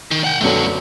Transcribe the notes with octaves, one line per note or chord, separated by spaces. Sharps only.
D#3
F#5 G5
B1 F#2 D3 A3 F#4